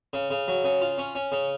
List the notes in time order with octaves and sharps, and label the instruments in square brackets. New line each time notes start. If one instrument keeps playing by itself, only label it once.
[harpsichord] C#3
C#3
F#3
C#3
F4
C#4
C#4
C#3